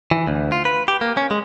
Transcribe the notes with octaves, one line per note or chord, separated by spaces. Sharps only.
E3
D2
F4
B4
G4
A#3
C#4
G#3